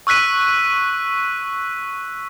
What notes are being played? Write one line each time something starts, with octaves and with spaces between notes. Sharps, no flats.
C#6 E6 F#6 B6 D#7